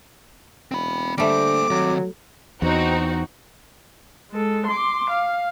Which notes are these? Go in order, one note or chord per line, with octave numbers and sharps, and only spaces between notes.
E1 C4 B5
D3 G3 A3 A#3 C5 D6
D#3 F#3 C4
E2 C4 D#4 F#4
G#3 A4
C6 D6
F5